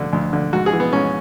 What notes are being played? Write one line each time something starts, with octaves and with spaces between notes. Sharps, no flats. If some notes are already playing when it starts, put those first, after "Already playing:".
Already playing: D2 D3
D2
D3
G#2 F#4
G#4
E3
B3
G#2 C#4